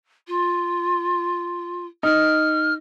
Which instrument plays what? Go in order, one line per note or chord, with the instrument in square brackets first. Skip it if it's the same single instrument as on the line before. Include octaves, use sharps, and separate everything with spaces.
[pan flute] F4
[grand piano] D#4 [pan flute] F6